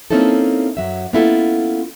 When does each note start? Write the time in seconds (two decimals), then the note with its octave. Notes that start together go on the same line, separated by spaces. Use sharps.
0.11 A#3 C4 C#4 D#4 E4 A4
0.77 F#2 F#3 E5
1.13 A#3 B3 C#4 E4 F4 A4